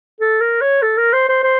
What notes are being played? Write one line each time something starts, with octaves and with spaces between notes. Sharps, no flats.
A4
A#4
C#5
A4
A#4
C5
C5
C5